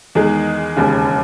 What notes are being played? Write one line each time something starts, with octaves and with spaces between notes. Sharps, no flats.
E2 D#3 G#3
E1 D#2 C#3